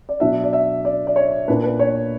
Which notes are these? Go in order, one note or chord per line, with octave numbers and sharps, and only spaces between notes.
D5
B2 F#3 B3 D4 E5
D5
E5
D5
D5
C#5
A#2 A#3 D4 B4
B4
C#5